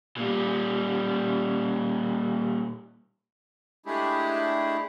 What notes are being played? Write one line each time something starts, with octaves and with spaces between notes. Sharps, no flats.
A#2 G3
G#3 A3 D4 E4 G4 G#4